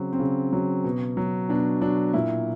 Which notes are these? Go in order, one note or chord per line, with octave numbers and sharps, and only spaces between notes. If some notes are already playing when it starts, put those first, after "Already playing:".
Already playing: C#3 F#3 C4
C4
C#3 C#4
F#3
B2
F#3
B2 D4
F#3 D4
A#2 E4